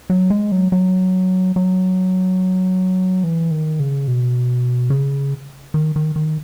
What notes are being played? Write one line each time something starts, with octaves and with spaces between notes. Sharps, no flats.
F#3
G#3
F#3
F#3
F#3
E3
D#3
C#3
B2
C#3
D#3
D#3
D#3